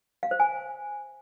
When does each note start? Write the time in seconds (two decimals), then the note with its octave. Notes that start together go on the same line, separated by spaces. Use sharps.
0.23 F5
0.31 C5
0.40 G#5